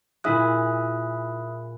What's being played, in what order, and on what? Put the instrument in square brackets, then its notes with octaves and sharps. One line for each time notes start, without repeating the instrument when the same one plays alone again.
[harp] A#2 E4 G#4 [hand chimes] E5 D#6 F#6